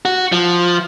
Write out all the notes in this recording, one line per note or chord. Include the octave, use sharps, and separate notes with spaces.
F#4
F3